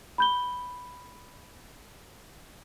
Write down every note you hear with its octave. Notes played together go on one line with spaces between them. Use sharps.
B5 G6 G7